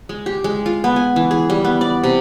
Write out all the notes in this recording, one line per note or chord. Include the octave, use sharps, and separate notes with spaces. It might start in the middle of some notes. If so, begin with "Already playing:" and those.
G#3
G4
G#3
F4
B3
G#5
E3
G#4
G3
B3
D5
C3